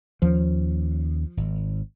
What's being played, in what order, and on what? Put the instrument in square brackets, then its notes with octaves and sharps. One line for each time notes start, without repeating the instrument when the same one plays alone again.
[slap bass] D#2 C#4 [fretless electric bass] F3
[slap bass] G#1